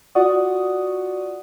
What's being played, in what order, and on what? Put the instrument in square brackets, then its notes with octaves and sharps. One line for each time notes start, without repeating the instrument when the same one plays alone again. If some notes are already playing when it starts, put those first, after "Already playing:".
[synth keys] F4 F#4 D5 F#5 C#6 D#6